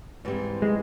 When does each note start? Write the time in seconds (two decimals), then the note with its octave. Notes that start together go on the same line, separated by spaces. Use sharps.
0.25 G#2 E3 G3 C4
0.62 G#3